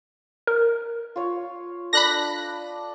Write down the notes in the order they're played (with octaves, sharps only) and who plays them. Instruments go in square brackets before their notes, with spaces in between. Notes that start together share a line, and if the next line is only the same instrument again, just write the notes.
[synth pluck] A#4
[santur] F4 C#5
[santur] D4 A4 D#5 [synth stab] B5 F#6 A#6